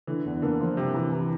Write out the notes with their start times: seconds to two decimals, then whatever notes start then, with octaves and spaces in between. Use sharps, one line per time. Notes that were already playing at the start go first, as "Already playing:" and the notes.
0.07 D3 E3
0.25 E2
0.42 D3 A#3
0.61 F3
0.77 C3 G3
0.94 E3
1.13 E3